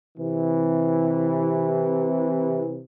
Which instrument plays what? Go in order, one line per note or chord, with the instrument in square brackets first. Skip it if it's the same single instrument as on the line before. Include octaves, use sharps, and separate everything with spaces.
[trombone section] C3 E3